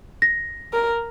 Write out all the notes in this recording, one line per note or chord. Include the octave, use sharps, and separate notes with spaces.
A#6
A#4